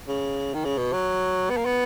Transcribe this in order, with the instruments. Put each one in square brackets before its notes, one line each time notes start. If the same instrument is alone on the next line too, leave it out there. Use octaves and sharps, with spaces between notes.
[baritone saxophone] C#3
D#3
C#3
B2
F#3
B3
A#3
B3